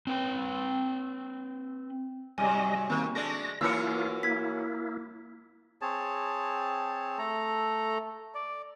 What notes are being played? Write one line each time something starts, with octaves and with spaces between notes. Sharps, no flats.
C4 B4 G5
G#2 C3 F#3 G3 D#5 G#5
D#3 A#3 C4
G#3 A3 D4 A#6
E3 F#3 A#3 E4 F4 A#4 E6 C#7
A#3 E4 G#6 B6
C4 G#4 C#5 A5
A3 A4 A#5
D5